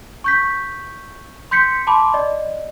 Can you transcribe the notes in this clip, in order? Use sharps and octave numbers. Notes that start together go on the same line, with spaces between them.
C#6 G6 B6
C6 G6 B6 C#7
A5 B5 C6 D6
D5 D#5